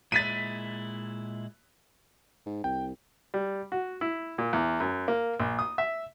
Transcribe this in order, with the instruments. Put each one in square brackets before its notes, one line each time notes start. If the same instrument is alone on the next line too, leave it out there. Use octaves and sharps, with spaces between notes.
[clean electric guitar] A#2 G#3 E4 [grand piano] A6 B6 D#7
[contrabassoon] G#2
[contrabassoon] C2 [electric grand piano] G5
[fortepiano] G3
F#4
E4
A#2
E2
F#2
A#3
A#1
D#6
E5